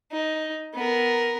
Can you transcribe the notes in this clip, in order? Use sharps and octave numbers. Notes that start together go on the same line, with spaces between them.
D#4
B3 A#4